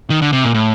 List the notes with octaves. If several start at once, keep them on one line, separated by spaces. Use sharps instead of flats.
D#3
D3
C3
A#2
A2